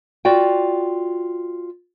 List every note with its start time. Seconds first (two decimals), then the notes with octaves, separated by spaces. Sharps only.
0.25 F4 F#4 D5 G5